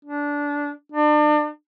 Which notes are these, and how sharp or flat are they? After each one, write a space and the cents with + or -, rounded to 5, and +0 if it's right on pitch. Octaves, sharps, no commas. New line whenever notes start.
D4 -15
D4 +35